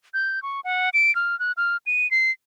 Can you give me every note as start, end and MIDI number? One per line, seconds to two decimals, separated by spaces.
0.14 0.42 91
0.43 0.60 85
0.64 0.90 78
0.94 1.14 98
1.15 1.38 89
1.40 1.52 90
1.57 1.77 89
1.86 2.09 99
2.11 2.31 96